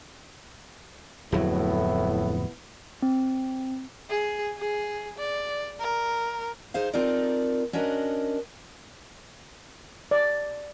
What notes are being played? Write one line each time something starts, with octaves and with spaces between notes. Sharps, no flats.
D1 F2 A2 F#3 B3 E4
C4
G#4
G#4
D5
A#4
D#4 G#4 C5 F5
C4 D#4 F4 A4 A#4 D5
C#4 D4 F#4 A#4 D#5
D5